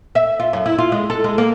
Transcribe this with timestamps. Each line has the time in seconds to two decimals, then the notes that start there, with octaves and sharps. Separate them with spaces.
0.15 E5
0.40 F4
0.53 F#2
0.66 E4
0.78 F4
0.92 G#3
1.10 A4
1.24 G#3
1.38 A#3